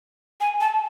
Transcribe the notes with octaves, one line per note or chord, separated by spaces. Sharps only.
G#5
A5